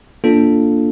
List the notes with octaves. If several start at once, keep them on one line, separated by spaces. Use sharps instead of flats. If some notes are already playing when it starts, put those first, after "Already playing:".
A#3 D4 F4 A4